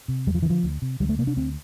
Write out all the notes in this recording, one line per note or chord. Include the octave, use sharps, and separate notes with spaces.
C3
E2 G3
F3
E3
D3 F3
D2
C3
D2 G3
A3
C3 A#3
D4
D2 C4